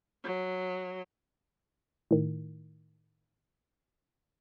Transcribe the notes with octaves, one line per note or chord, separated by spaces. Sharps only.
F#3
A2 D#3